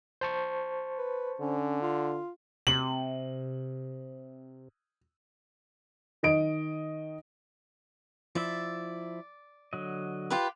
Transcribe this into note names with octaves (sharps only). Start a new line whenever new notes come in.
C5 A5 C#6
B4
D3 C#4
F4
C3 F#7
D#3 D#5 D7
F3 E4 D5 E5
D3 F#3 D#5
F4 G4 B4